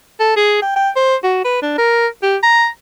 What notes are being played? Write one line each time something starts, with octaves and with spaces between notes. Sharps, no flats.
A4
G#4
G5
G5
C5
F#4
B4
D4
A#4
G4
A#5